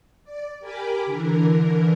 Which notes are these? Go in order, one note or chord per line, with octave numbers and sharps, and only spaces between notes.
D5
G4 A#4 G#5 B5 D6
D3 E3 A#4